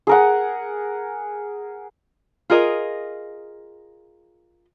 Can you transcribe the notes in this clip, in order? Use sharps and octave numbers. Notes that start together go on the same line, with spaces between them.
G#4 A#4 F#5
F4 G#4 A#4 D#5